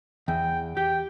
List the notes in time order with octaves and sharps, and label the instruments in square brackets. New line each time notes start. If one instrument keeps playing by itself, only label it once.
[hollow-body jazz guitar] E2 [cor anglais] G5
[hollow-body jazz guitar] G4 [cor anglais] G5